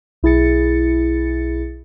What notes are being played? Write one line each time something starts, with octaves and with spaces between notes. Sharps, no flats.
B1 E4 G#4 A6 C#7